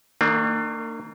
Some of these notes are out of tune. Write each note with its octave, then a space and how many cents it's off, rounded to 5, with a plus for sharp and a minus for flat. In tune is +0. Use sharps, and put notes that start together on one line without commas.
D#3 +15 A#3 -35 D4 +35